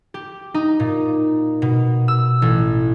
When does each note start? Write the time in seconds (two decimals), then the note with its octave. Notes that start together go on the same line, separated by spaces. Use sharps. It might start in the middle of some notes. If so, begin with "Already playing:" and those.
0.14 G4
0.54 D#4
0.80 A#2
1.62 B2
2.08 E6
2.42 A1